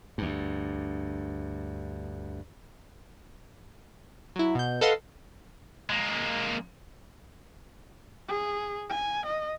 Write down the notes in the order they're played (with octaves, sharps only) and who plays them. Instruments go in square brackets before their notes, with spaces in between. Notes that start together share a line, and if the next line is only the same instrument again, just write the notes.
[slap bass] D2 G2
[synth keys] F#3 E4
B2 G6
A4 B4 D#5 F5 F#5 C6
[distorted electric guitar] G#3 A#3
[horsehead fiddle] G#4
G#5
D#5